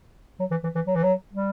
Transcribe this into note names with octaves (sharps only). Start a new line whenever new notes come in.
F#3
E3
E3
E3
F#3
E3
F#3
G3